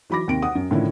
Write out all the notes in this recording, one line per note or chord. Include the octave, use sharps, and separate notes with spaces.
E3 F#3 B5 D6 A#6
D#2 C3 D7
F#5 D#6
F#2
A2 D3 D#3 F3 C#4 E4